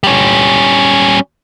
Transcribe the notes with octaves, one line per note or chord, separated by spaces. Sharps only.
G3 C#4